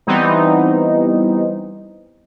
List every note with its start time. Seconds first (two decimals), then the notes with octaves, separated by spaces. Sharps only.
0.07 E3 G3 B3 C4 D#4